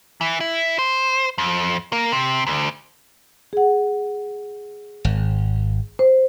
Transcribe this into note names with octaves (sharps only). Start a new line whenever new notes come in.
E3
E4
C5
F2
A#3
C3
D2
G#4 F#5
G#1
C5